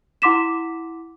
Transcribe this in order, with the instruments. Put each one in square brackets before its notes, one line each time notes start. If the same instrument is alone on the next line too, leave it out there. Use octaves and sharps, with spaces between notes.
[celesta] E4 F#5 C6 D6 B6 E7